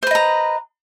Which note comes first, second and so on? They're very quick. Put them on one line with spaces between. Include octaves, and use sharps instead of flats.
C5 B4 D#5 A#5